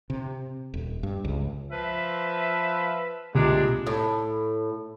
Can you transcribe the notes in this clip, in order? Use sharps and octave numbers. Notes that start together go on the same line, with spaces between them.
C3
D#1
G2
C#2
F3 B4 E5
C2 A#2 G#3 D4 G4
A2